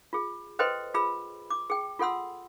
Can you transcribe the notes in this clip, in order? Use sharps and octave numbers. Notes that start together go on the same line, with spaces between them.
F4 G#4
A4 B4 C5 D#5 G5 C6
F4 G#4 B5 E6
D6
G#4 G5
F4 A4 F#5 C6 E6